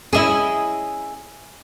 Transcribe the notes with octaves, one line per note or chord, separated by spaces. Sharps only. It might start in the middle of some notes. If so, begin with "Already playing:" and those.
C#4 E4 G#4 D#5 E5